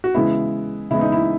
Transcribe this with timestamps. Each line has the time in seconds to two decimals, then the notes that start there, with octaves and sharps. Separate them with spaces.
0.04 F#4
0.14 C#3 E3 G#3 B3 E4
0.90 C#3 E3 G#3 B3 E4
1.01 D#4
1.12 E4